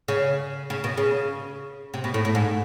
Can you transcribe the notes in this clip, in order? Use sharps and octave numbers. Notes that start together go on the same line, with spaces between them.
C#3
C#3
B2
C#3
C3
B2
A2
A2
G#2